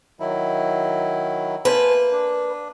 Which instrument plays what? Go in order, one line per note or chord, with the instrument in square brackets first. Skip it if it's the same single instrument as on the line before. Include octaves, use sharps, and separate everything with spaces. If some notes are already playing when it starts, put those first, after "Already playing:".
[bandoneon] D#3 F#3 E4
[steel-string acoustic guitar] A#3 B4 [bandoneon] C5 G#5 A5
[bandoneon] D4